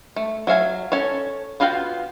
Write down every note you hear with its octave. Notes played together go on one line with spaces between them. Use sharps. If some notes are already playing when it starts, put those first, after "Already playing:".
A3
F#3 E5 F5 G#5
C#4 A4 C#5
B3 F4 F#4 F5 G5